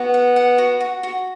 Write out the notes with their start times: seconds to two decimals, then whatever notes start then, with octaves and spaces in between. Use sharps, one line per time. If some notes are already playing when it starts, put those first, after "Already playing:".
Already playing: B3 F#4
0.14 F#5
0.36 F#5
0.58 F#4
0.80 F#4
1.03 F#4